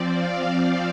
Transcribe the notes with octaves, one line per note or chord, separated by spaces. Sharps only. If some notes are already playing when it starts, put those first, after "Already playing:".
Already playing: F3 C4 D5
F5